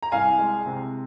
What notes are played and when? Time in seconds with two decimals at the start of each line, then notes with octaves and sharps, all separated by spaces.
0.03 A#5
0.12 C2 F5 G#5
0.38 G#3
0.66 C3